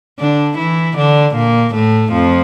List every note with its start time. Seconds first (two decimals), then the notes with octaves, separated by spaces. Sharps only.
0.19 D3 D4
0.58 E3 E4
0.97 D3 D4
1.35 A#2 A#3
1.74 A2 A3
2.13 F2 F3